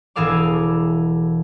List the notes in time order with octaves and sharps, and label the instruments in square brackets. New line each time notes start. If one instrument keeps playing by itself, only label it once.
[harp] E1 E3 G#4 A4 F5 D6